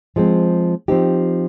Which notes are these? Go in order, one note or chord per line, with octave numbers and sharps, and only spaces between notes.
F3 G#3 C4
F3 C4 D#4 G4